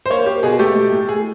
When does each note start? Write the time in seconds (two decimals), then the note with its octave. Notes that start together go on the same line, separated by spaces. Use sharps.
0.06 C5
0.10 A#3 C#5
0.26 A#3 G4
0.43 B2 G#4
0.59 A3 G4
0.76 A3
0.92 A2
1.09 G#4